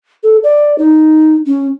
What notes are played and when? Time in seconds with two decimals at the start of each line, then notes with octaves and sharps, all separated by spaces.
0.23 A4
0.44 D5
0.78 D#4
1.46 C#4